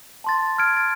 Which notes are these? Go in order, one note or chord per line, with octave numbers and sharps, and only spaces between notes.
A5 C6 A6
F6 G#6 D7
A6